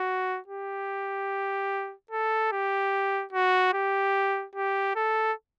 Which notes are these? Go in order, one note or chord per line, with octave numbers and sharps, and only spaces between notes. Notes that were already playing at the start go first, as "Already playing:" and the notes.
Already playing: F#4
G4
A4
G4
F#4
G4
G4
A4